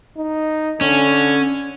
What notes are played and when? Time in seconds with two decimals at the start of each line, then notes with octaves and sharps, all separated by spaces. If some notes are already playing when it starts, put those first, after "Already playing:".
0.17 D#4
0.81 D3 C#4